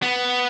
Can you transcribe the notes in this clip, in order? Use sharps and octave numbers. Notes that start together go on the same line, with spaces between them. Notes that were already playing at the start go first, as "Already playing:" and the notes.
B3